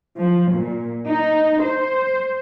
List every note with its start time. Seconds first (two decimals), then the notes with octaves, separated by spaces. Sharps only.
0.17 F3
0.54 A#2
1.08 D#4
1.63 C5